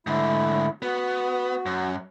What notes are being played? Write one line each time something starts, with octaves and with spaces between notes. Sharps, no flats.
G#2 D3 A3 E4
B3 F#4
F#2